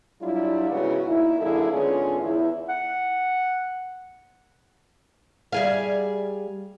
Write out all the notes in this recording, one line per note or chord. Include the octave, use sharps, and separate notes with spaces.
F#3 G3 D4 E4 F4
G#2 C#3 B3 E4 F#4
A#2 D#3 D#4 E4
F#2 D3 A#3 E4 G#4 A4
G#2 D3 B3 C#4 F4 G#4
E2 E4
F#5
G3 G#4 F5